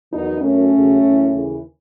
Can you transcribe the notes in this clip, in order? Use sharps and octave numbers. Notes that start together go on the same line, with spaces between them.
E2 D#3 F#3 B3 D#4
F#2 D#3 F#3 A3 C#4
D#2 C#3 F#3
F#2 E3
D#2 C#3 E3